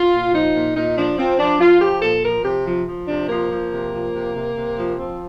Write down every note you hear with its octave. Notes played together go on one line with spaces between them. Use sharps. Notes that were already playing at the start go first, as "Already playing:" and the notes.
Already playing: F4
A#2
F3 D#4
A#2
A#2 D#4
F3 D4
F3 C4
F3 D4
F3 F4
F3 G4
A#2 A4
F3 A#4
C3 G4
F3
F3
C3 D4
F3 A#3
F3
C3
F3
C3
C3
C3
F3
F3 C4